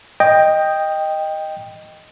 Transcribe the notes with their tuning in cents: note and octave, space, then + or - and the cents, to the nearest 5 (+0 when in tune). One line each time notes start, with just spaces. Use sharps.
D#5 +0 G5 +10